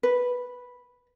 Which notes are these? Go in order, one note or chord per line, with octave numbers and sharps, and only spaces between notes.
B4